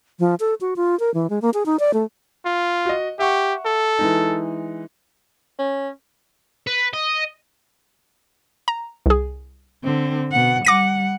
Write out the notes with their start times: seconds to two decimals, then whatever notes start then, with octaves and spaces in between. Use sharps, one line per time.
0.20 F3
0.40 A4
0.61 F#4
0.76 F4
1.00 A#4
1.14 E3
1.30 G#3
1.42 A#3
1.54 G#4
1.66 D#4
1.79 D5
1.94 A3
2.45 F4
2.86 F#4 D#5
3.19 G4 E5 F#5 C#6
3.66 A4
3.99 E3 G#3 D#4
5.59 C#4
6.67 B4
6.93 D#5
8.68 A#5
9.06 C2 G#4
9.84 D3 C4
10.32 B2 F#5
10.65 G3 F#5 D6 A#6 D#7